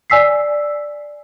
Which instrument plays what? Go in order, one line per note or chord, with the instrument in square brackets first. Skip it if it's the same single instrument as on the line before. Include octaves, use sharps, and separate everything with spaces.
[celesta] D5 G#5 E6 B6 C7